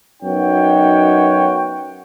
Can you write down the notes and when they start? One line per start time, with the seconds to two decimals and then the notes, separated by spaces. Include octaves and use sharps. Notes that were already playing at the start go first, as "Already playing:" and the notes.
0.23 F#2 B3 D#4 F#4 C#5 G5